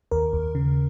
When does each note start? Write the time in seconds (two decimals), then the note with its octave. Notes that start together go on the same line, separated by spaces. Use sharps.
0.11 D#2 A#4
0.33 D#2
0.55 C#3